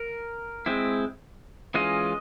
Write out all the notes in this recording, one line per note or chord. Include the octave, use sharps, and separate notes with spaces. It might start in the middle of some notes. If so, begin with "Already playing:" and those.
Already playing: A#4
G#3 C4 E4
E3 G#3 C#4 F4 D#5